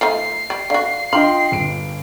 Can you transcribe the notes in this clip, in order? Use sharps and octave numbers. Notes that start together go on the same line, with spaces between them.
F3 A3 D#4 C7
G3
D3 F#4 D5 F5
D4 F4 D#5 F5 G5 C6 F#7
G1 D7